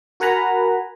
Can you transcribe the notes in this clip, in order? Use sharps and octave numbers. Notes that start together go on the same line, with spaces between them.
F#4 A#4 F#5 G#5 A#5 B5